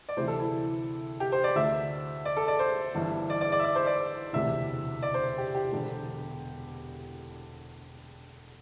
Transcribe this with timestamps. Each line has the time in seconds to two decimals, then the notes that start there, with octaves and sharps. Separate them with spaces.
0.09 D5
0.17 D2 C3 E3 C5
0.28 A4
0.40 E4
1.20 G4
1.32 C5
1.44 D5
1.55 D2 D3 E5
2.25 D5
2.37 A4
2.48 D5
2.59 C5
2.95 G1 G2 E3
3.30 D5
3.41 D5
3.52 D5
3.59 E5
3.64 D5
3.75 C5
3.87 D5
4.33 E1 D2 C3 E3 E5
5.03 D5
5.14 C5
5.38 G4
5.55 G4
5.72 E1 E2 D3